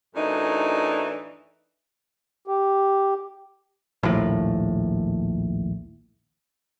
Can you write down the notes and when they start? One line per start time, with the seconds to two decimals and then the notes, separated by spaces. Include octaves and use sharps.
0.15 F#2 A2 E3 D4 D#4
2.48 G4
4.03 A#1 D#2 A2